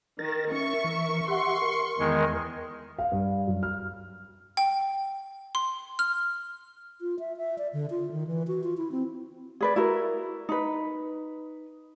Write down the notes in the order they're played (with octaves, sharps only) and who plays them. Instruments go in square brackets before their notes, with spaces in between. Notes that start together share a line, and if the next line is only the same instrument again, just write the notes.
[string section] D#3 [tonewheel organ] A#4 A6 A#6
[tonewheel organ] C#4 [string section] A#4 E5 C#6
[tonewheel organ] E3
[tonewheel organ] G4 E5 F#5 [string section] C6 C#6
[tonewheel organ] A#4
[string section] E2 [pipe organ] D#3 G#3
[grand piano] F5
G2
F#2
F6
[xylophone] G5
C6
F6
[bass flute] F4
E5
E5
D5
D3
F4
D#3
E3
F#4
F4
E4
C4
[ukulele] G#4 B4 D5
E4 F#4 A#4
D#4 B4